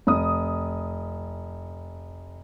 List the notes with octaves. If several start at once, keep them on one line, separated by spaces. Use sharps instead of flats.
F1 D#6